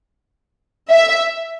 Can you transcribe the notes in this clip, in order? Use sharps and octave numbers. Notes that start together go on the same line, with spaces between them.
E5